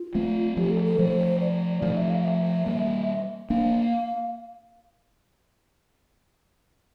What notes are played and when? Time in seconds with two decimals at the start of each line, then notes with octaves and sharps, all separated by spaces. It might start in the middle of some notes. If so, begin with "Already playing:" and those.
Already playing: F4
0.15 A3 C4
0.57 F3 A3 G4
0.70 A4
0.85 A4
0.98 F3 A3 C5
1.41 D5
1.82 F3 A3 D5
1.97 E5
2.10 F5
2.21 F5
2.24 E5
2.66 G3 A#3
3.50 A#3 D4 F5